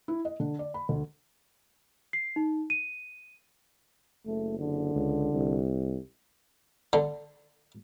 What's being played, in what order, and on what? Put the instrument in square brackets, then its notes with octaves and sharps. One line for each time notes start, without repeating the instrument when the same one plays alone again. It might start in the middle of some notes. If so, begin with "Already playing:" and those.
[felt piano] E4
D#5
D3
D5
B5
D2
[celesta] C7
D#4
D#7
[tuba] F#1 [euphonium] A3
[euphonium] D3
[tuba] C#2
C2
[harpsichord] D3